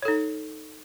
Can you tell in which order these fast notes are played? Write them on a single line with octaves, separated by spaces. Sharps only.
C#5 A4 D#4